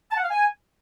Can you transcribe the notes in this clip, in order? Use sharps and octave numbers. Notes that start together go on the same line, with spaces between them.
A5
F#5
F5
G#5